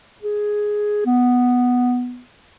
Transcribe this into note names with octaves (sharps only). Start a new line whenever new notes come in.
G#4
B3